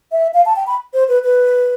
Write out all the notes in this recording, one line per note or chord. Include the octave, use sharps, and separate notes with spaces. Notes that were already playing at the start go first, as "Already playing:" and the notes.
E5
F5
A5
G5
B5
C5
B4
B4